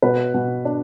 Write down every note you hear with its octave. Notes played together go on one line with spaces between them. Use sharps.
B2 B4
B2
D4